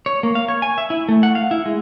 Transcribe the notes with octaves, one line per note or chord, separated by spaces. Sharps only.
C#5
A#3
F5
C#5
G#5
E5
E4
A3
F#5
F5
E4
G#3